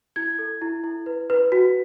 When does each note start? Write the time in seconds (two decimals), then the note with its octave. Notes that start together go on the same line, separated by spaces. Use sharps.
0.16 E4 G#6
0.39 A4
0.62 E4
0.84 E4
1.06 B4
1.30 B4
1.52 F#4